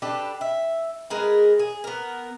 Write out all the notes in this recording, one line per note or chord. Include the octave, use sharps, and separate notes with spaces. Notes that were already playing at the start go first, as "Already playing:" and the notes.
D4 G4 A4 B4
E5
G#3 G#4 A#4 B4
G#4
B3 A#4